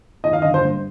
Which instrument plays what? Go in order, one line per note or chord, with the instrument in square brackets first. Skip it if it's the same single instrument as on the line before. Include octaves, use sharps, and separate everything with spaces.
[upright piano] D#3 D#5
F5
G1 D#5
C5
G2